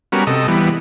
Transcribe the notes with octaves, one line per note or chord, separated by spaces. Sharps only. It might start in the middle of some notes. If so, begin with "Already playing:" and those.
G3 B3 C#4 F#4 A#4
C3 A4 D#5
E3 G3 B3